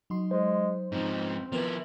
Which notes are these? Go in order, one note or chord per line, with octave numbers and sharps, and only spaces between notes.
F#3 D#4 C6
G#3 C5
G#2 F3 C4 D#4
F3 B3 E4 A#4 B4